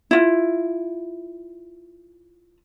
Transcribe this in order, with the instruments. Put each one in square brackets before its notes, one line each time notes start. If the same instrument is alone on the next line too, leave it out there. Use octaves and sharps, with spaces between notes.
[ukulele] E4 F4